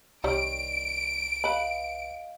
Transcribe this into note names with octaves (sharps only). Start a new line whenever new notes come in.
C2 D#3 G3 C#5 D7
B4 D#5 F5 B5